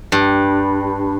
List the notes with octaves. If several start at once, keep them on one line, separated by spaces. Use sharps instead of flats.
G2